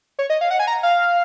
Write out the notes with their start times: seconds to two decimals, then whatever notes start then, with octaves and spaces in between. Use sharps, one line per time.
0.19 C#5
0.30 D#5
0.41 F5
0.51 F#5
0.59 G#5
0.67 A#5
0.83 F5